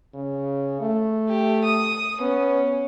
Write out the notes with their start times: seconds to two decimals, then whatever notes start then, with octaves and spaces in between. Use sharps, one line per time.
0.14 C#3
0.81 A3
1.28 G4
1.64 D#6
2.21 B3 C#4